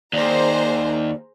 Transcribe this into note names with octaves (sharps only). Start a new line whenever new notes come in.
D#2 G#4 C5 D5 A#5